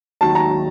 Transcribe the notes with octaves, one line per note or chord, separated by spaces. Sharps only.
D#2 D#3 F#3 A5
A#5
D#3 F#3